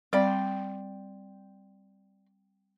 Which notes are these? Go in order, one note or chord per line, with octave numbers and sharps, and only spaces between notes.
G3 C4 D5 G5 C6